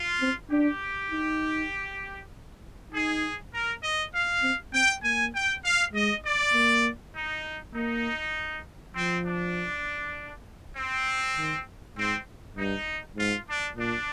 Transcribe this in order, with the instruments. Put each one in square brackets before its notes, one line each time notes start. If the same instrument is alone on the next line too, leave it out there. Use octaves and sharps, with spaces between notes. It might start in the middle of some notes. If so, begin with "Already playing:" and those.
Already playing: [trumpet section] F4
[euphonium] C4
[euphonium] D4 [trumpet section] G4
[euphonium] D#4
[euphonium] D#4 [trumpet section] G#4
[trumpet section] A#4
D#5
F5
[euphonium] C4
[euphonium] C4 [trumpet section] G5
[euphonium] A#3 [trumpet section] G#5
[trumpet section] G5
F5
[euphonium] G#3 [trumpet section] D#5
[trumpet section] D5
[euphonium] A#3
[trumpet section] D#4
[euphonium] A#3 [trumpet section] D#4
[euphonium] F3 [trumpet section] C4
[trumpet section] D4
C4
[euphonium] D#3
[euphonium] G#2 [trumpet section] C4
[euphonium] G2 [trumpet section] D#4
[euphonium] G#2 [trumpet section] F4
[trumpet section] D4
[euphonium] A#2 [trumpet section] D4